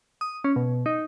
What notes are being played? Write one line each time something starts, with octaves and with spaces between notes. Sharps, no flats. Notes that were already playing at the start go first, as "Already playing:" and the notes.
D#6
C#4
B2
D#4